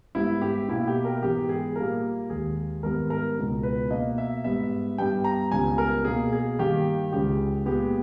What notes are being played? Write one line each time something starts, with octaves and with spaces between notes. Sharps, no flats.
G#2 G3 B3 E4
G4
B2 A#3 E4
G4
A#4
G#2 E3 G#3 B3 G4
G#4
A#2 G3 A#3 A#4
D#2 D#3 G#3 G#4
G#2 D#3 G3 B3 A#4
A#4
C#2 B2 G#3
B4
B2 A#3 D#5
E5
G#2 G3 B3 E5
G2 G3 B3 G5
A#5
C#2 C#3 G3 B3 G#5
A#4
B2 A#3 G#4
G#4
G2 D#3 A#3 G4
C#2 C#3 G#3 G4
A#2 G#3 B3 G4